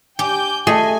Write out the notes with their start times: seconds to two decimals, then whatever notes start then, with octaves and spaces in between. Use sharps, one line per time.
0.19 G4 G5 G#5 D6 G6
0.67 A3 G#4 D#5 G#5